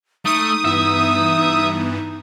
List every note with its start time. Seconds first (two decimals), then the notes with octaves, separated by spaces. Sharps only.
0.25 A3 D#4 D#6
0.65 G2 E3 B3 E5